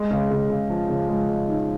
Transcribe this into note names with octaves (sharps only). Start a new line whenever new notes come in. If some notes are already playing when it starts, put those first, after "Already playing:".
Already playing: G#3
C#3
C#3
C#3
F3
C#3
G#3
G#3
D#4